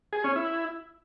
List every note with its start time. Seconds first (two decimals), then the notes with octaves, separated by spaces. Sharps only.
0.13 G#4
0.24 C#4
0.36 E4